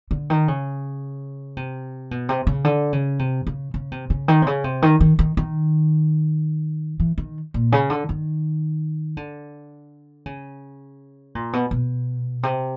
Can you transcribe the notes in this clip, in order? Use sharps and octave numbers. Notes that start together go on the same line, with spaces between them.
D3
D#3
C#3
C3
B2
C3
C#3
D3
C#3
C3
C#3
C#3
C3
C#3
D#3
C3
C#3
C3
D#3
D#3
D#3
D#3
E3
D#3
A#2
C#3
D3
D#3
D3
C#3
A#2
B2
B2
C3